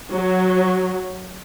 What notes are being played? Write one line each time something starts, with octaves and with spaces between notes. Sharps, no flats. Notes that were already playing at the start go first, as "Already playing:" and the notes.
F#3